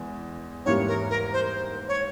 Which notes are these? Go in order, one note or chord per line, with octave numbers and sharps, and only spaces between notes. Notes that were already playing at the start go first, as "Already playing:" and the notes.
Already playing: E2 G#3
G#2 E3 G3 A#3 C#5
A#4
A#4
C5
C5
C#5